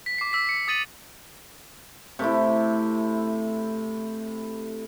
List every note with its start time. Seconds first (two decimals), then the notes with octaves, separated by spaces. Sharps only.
0.06 B6
0.18 D6 C7
0.33 E6 B6
0.49 C#7
0.68 D#6 A6 D#7 F#7
2.19 C3 A3 E4